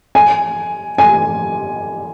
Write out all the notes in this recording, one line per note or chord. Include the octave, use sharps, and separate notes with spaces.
G#5
G#5